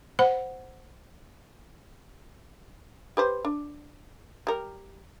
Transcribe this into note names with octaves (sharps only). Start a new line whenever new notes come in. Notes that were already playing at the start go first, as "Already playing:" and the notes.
C5 F#5 B5
G4 B4 C5
D4
G3 A#4